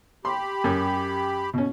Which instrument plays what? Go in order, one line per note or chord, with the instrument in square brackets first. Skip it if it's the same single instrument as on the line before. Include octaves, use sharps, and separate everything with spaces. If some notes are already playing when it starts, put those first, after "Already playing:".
[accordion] G4 B5 [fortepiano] C6
[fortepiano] F#2
B2 C#4